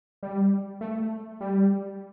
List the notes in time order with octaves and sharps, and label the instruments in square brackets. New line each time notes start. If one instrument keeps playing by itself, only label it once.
[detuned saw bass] G3
A3
G3